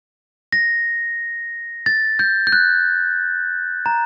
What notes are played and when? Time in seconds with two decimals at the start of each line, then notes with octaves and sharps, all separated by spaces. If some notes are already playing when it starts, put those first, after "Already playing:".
0.53 A#6
1.86 A6
2.19 G6
2.47 G6
2.52 F#6
3.86 A#5